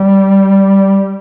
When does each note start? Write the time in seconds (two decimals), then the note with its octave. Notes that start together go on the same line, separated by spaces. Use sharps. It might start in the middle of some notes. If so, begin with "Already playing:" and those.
Already playing: G3